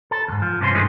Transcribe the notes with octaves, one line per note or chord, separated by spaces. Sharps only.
A4
D#2 G#2
F3
G2 C3 F3 C4 C#4 C6
G2 D3 D#3 G#3 A3 D#4